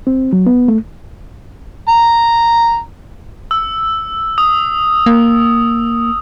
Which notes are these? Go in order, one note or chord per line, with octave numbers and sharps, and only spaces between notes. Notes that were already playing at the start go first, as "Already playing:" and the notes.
C4
F#3
B3
A3
A#5
E6
D#6
A#3